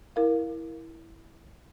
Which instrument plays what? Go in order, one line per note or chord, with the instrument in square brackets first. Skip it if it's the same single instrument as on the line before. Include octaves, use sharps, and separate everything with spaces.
[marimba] E4 A#4 F5